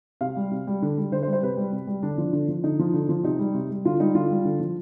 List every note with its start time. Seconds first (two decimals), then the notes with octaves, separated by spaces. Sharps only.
0.21 C3 F5
0.36 G3
0.51 C3
0.67 G3
0.82 D3
0.98 G3
1.12 D3 C5
1.23 C5
1.27 G3
1.33 C5
1.43 C3 B4
1.57 G3
1.72 C3
1.87 G3
2.03 D3 D4
2.18 F3
2.33 D3
2.48 F3
2.64 D3 D#4
2.79 F3
2.93 D3
3.09 F3
3.24 C3 D#4
3.39 G3
3.54 C3
3.69 G3
3.85 D3 F4
4.00 G3 D#4
4.14 D3 F4
4.31 G3
4.45 D3
4.60 F3